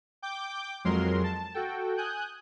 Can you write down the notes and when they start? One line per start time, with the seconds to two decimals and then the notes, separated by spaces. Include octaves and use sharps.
0.22 G5 D6 G6
0.85 F2 F#3 G#3 A#4 C6
1.24 A5
1.54 F#4 A4 G5
1.97 G#5 D#6 F#6 G6